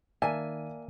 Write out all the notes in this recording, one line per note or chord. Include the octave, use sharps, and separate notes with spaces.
D#3 A#3 D5 E5 F5 G#5 A5 D#7